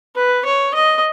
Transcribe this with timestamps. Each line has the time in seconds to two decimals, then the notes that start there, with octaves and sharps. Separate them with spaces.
0.16 B4
0.45 C#5
0.74 D#5